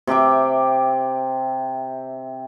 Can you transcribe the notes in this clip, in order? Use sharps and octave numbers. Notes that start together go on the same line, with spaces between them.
C3 G4 E5 D6